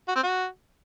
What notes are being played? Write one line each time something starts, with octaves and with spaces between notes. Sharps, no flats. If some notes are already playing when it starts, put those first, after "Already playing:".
F#4
C4
F#4